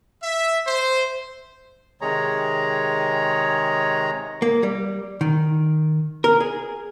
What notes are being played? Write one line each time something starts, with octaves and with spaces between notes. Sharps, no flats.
E5
C5
C3 D#3 G#3 G#4 C#5 A#5
A#3
G3
D#3
A#4
G#4